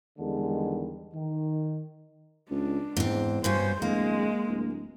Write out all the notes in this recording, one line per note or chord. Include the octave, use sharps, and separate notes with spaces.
E2 D3 D#3 G3 G#3
D#3
C#2 D4
E2 G#2 C4
G2 B2 C#4 C5
D1 G#3 A#3
D1